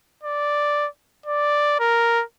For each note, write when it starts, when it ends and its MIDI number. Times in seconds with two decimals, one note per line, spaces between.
0.23 0.88 74
1.26 1.77 74
1.80 2.23 70